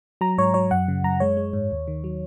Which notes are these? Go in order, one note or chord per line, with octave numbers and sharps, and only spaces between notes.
F#3 A#5
G#2 C#5
F#3 C#5
F#2 F#5
C#3
F#2 A#5
G#3 C#5
G#3
G#2
D#2
D#3
F#3